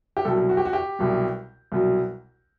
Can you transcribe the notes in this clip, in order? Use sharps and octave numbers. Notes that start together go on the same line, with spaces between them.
G4
C2 B2 F#3 A4
F#4
G4
F#4
G4
C2 B2 F#3
C2 B2 F#3